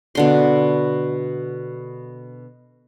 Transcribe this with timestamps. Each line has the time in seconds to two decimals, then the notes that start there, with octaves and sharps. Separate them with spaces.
0.15 B2 D3 C6